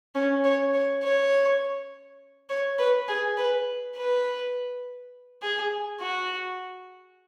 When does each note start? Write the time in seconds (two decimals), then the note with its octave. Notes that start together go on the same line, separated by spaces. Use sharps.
0.15 C#4
0.44 C#5
0.74 C#5
1.03 C#5
2.50 C#5
2.79 B4
3.08 G#4
3.37 B4
3.96 B4
5.42 G#4
6.01 F#4